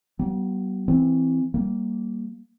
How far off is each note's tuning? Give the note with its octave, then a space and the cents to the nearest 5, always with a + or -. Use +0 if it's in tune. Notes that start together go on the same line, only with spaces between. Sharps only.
G3 -45 B3 -25
E3 +0 C4 +0
G3 -15 A#3 +0